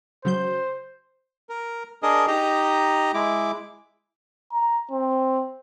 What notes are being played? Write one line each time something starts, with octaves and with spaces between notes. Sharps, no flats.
C#3 F#3 C5 G6
A#4
D4 G#4 A#4 D#5
D#4 G4 D#5 A#5
G#3 E4 D6
A#5
C4